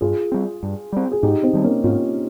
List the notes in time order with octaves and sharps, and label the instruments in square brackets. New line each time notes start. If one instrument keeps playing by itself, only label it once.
[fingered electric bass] G2 [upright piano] F4 G#4
[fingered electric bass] G3 C4
G2
G3 C4
[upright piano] G#4
[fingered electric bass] G#2 [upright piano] D#4 G4
[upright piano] C4 D#4
[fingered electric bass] D#3 G3
[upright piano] A#3 C#4
[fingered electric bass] G#2 [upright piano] C#4 F4